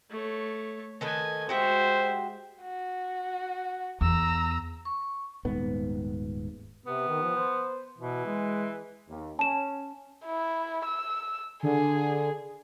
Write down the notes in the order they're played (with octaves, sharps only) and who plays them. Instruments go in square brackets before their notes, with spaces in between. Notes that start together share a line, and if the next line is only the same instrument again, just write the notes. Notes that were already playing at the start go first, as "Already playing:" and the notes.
[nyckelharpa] A3 C#5
[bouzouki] D#3 A4 B4 [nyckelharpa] D#5 G#5
[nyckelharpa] G#3 E5 [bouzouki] F#4 G4 F#5 [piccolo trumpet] C5
[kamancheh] F#4
[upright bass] E2 [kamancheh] A#5 E6
[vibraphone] C#6
[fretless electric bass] D#1 G#2 B3
[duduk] C3 [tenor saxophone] B3
[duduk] D#3
F3
C5
[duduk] B2 [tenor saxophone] E3
[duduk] G#3
[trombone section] D#2
[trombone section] C#4 [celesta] A5 E7
[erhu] E4
E6
[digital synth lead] D3 [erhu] G#4